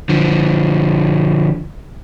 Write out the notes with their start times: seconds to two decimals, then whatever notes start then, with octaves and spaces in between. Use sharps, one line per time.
0.09 D3 F3